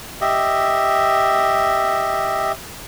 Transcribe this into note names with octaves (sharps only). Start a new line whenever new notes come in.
G4 D#5 E5